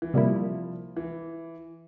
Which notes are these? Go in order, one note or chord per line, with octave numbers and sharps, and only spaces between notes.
E3
C3 F3 G3 A#3 E4
E3